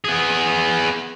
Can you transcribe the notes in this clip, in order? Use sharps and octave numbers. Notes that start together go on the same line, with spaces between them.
B3 G#4